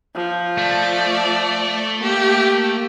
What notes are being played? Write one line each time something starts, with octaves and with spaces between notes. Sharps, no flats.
F3
A3 D5
A#3 G4